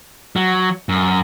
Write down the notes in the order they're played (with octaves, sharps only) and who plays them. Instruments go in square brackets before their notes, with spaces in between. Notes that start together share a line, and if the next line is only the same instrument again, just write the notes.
[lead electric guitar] F#3
F#2